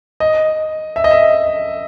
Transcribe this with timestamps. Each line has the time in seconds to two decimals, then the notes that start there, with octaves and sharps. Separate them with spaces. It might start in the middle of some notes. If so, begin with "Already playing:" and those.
0.20 D#5
0.96 E5
1.04 D#5
1.11 E5